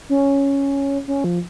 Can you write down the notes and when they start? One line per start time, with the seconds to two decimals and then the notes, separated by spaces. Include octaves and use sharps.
0.09 C#4
1.08 C#4
1.24 F3